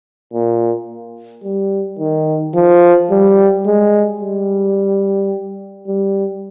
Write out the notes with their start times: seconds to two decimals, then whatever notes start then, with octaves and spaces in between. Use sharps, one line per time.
0.33 A#2
1.43 G3
1.99 D#3
2.55 F3
3.10 G3
3.66 G#3
4.21 G3
5.87 G3